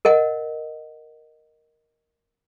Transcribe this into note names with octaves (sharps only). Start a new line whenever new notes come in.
A#4 D#5 F#5